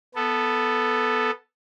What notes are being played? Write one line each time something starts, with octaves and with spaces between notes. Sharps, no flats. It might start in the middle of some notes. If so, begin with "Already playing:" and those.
B3 A4